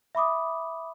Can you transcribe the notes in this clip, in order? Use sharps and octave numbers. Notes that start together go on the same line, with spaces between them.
E5 B5 D6 D#6